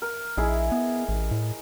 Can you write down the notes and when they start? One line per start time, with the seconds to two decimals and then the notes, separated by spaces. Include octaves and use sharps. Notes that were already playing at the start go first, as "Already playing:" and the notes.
0.02 A#4
0.37 A#1 D#4 E4 G#4
0.72 B3
1.09 A1
1.31 A2